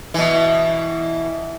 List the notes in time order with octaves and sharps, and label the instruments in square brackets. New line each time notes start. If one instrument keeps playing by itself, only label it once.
[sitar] B2 E3